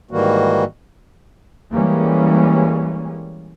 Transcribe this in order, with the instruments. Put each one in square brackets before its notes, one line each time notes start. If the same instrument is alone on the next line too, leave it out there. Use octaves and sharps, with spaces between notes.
[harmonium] G#2 D#3 E3 G3 A#3 F#4
[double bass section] E3 G3 G#3 A#3 C#4